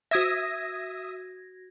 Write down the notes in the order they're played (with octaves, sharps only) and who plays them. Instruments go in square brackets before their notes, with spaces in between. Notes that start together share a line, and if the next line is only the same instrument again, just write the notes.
[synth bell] F#4 G#6 A#6 [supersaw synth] E5 D#6